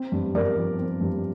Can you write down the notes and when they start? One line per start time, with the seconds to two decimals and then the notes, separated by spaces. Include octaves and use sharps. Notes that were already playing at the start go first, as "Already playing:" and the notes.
Already playing: C4
0.12 G2
0.34 G2 A#4 D5
0.56 F3
0.79 C4
1.01 G2